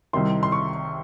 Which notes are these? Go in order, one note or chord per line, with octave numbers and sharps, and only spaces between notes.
C2 C3 D#3 C6
C6
C#6